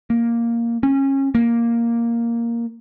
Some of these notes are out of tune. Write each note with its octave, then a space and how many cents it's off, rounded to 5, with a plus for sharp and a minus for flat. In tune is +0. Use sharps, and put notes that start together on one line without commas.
A#3 +0
C#4 -25
A#3 +0